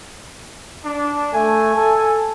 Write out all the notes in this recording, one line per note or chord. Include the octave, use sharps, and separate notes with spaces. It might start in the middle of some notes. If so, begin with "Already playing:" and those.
D4
A3 G#5
A4